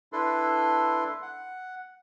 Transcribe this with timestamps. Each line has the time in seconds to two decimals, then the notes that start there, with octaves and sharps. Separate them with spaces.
0.13 D4 E4 A4 B4 C6
1.22 F#5